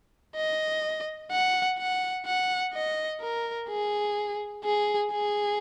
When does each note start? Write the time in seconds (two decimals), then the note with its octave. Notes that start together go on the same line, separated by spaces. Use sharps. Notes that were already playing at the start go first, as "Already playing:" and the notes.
0.36 D#5
1.31 F#5
1.78 F#5
2.26 F#5
2.74 D#5
3.21 A#4
3.69 G#4
4.64 G#4
5.11 G#4